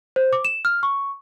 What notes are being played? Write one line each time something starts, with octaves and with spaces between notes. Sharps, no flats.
C5
D6
E7
F6
C#6